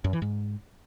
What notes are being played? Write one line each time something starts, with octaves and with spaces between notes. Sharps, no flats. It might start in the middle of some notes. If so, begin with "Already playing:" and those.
F#2
E3
G#2